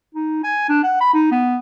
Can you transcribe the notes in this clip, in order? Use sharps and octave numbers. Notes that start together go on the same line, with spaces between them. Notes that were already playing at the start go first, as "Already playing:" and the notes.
D#4
G#5
D4
F#5
B5
D#4
B3